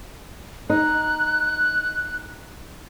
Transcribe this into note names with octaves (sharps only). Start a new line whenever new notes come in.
D#4 F#6